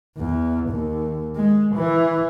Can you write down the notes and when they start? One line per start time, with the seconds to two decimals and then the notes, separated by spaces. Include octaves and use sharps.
0.17 E2
0.69 D#2
1.36 G#3
1.75 E3